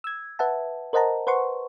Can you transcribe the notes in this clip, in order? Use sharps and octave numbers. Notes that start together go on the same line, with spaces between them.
E6 G#6
B4 E5 F#5 A5
A#4 C5 D#5 F#5 A5 A#5
B4 C5 F#5 C6 C#6